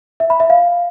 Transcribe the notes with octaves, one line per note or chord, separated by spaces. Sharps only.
E5
B5
E5
F5